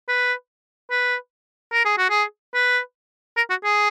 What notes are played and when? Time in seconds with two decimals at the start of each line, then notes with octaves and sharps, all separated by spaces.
0.08 B4
0.91 B4
1.73 A#4
1.85 G#4
1.98 F#4
2.10 G#4
2.54 B4
3.37 A#4
3.50 F#4
3.64 G#4